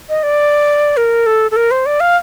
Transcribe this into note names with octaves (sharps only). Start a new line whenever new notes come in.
D#5
D5
A#4
A4
A4
A#4
C5
D5
F5